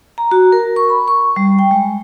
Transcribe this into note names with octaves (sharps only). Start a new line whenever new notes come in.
A#5
F#4
A#4
C#6
B5
C#6
G3
G5
G#3